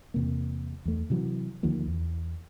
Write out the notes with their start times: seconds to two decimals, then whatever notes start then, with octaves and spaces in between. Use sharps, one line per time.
0.14 E2 C3 A#3
0.85 E2 A3
1.10 C3 E3 F#3
1.63 D2 D#3 F3 A#3
1.87 E2